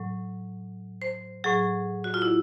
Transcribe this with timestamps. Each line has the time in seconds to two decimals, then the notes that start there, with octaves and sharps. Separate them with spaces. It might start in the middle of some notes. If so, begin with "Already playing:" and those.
Already playing: A2 F#3
1.02 C5
1.44 A2 F#3 G#4
2.04 F#4
2.14 F4
2.22 E4